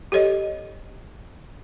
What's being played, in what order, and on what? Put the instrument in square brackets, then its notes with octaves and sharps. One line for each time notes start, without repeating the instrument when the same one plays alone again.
[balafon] G4 A4 C#5 D#5